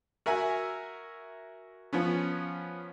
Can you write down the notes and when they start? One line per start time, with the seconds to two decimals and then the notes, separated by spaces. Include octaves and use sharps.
0.26 F#4 A#4 E5 G#5
1.93 F3 B3 C#4